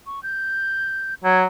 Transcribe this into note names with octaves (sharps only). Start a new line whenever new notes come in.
C#6
G6
F#3 G#6